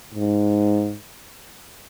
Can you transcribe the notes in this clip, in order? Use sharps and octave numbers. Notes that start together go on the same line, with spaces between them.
G#2